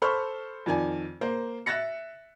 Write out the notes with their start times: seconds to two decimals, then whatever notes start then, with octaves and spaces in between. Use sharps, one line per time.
0.02 A4 C5 B5 C#6 F6
0.66 F2 D#3 D5 G#5
1.21 A#3 C5
1.66 E5 F#6 A6 A#6 C#7